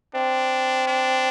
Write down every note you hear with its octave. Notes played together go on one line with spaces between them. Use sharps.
C4 D4
D4